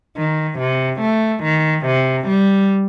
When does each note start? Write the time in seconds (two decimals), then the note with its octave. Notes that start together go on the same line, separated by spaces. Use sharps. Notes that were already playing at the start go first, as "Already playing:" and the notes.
0.17 D#3
0.59 C3
1.01 A3
1.44 D#3
1.86 C3
2.28 G3